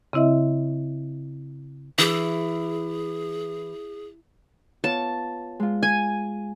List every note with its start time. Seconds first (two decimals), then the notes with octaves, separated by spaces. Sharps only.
0.13 C#3 C4 E4 D#5 E5
1.98 E3 G#4
4.84 B3 F4 C#5 A5
5.60 G#3 F4
5.83 G#5